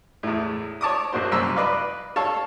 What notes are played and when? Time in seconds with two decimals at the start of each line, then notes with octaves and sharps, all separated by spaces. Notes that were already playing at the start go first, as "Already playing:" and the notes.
0.23 E2 A2
0.81 C#5 A5 D6 D#6
1.12 A#1 A#3 F#4 C5
1.32 C2 F#2 A#5 E6
1.56 B4 D5 D#5 F5
2.16 A4 C#5 F5 A5